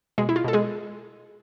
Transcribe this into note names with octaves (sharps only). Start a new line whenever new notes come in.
B2 G#3 G#4
E4
F4
B2 A4
G#3 G#4